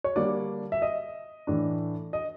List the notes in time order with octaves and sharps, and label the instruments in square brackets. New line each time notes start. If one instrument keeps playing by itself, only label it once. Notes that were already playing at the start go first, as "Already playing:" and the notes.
[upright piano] C#5
D3 G3 A#3 D4 D5
E5
D#5
A2 E3 A3 D4
D#5